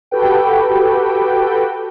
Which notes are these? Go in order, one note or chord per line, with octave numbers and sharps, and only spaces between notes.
F#4 G4 A4 B4 G5